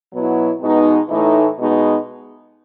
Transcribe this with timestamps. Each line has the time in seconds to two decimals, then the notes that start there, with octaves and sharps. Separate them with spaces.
0.12 B2 F#3 B3 E4
0.60 B2 G#3 B3 D#4
1.08 A2 E3 A3 D#4
1.57 B2 G#3 B3 D#4